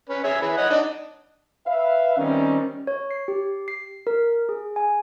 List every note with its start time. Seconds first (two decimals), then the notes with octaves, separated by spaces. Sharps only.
0.09 C#4 B4
0.24 G#4 C#5 E5
0.42 E4 G#4 B4
0.57 C#5 D#5 F#5
0.70 D4 D#4
1.67 B4 E5 F5
2.18 D#3 G3 C4 C#4
2.87 C#5
3.11 C7
3.28 G4
3.68 C7
4.07 A#4
4.49 G#4
4.76 G#5